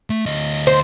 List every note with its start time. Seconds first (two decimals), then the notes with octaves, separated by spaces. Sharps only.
0.10 A3
0.26 D2 D#5
0.67 C5